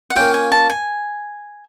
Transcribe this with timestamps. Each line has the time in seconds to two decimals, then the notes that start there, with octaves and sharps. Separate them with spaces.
0.10 F#5
0.16 A#3 C#4 F4 G5
0.34 G#5
0.52 A5
0.70 G#5